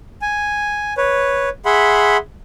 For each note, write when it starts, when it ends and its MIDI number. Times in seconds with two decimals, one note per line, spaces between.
0.22 0.94 80
0.97 1.49 71
0.97 1.49 73
1.65 2.17 68
1.65 2.17 76
1.65 2.17 78
1.65 2.17 83
1.65 2.17 84